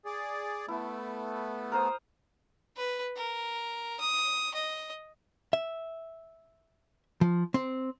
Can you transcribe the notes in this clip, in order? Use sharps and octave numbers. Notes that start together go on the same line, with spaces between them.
G#4 D5
A3 B3 E4
A#4 C5 D#6
B4
A#4
D#6
D#5
E5
F3
C4